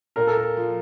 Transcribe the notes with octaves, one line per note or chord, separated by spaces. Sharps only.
A#2 A#4
A4
A#4
F3